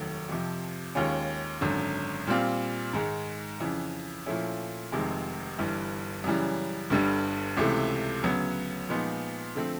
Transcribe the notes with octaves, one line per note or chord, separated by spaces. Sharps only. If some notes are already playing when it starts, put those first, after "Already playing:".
Already playing: F1 D#2 D#3 F#3 A3
F2 C3 F3
D#2 D#3 G#3 C#4 F4
G#1 F#2 D3
A#2 G3 C4 F4
G#2 D#3 G#3
F2 C#3 E3
A#2 F3 A3 C#4 E4
F1 F2 C3 D#3 G#3
G1 G2 E3 G3
F#2 C#3 E3 G3
G1 G2 D3 G3
C#2 C3 E3 A3
D2 C#3 F#3 B3
A#2 F3 G#3 B3 D#4
D3 F3 A3 C4